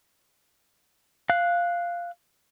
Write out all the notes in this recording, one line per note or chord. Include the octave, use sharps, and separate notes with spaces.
F5 F#6